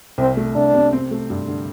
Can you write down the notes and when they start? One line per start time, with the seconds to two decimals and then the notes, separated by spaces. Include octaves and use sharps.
0.18 C2 C4
0.37 A3
0.55 C2 D4
0.74 C3
0.93 C4
1.11 A3
1.30 G2
1.48 D3